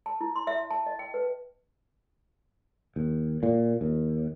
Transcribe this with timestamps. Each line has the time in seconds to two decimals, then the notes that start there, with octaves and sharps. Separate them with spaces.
0.06 A5
0.21 E4
0.36 C6
0.47 E5
0.71 A5
0.86 D#5
0.99 G5
1.14 B4
2.96 D#2
3.43 A#2
3.81 D#2